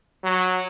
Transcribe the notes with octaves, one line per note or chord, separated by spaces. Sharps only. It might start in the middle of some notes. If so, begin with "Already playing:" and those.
F#3